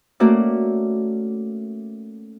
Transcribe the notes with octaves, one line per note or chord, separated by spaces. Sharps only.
A3 A#3 C#4 F#4 D5